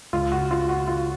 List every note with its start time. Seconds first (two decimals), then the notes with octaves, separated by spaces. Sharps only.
0.13 C#2 C#3 G#3 F4
0.32 F#4
0.51 F4
0.69 F#4
0.88 F4